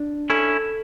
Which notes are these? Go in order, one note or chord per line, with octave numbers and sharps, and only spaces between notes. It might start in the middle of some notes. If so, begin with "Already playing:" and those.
Already playing: D4
C#4 E4 A4